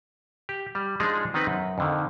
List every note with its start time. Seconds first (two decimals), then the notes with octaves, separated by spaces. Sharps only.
0.49 G4
0.75 G3
1.00 F3 G#3 D4 D#4 G#4
1.34 D#3 B3 C4 D#4 B4
1.47 F#2
1.78 F2 D3 D#3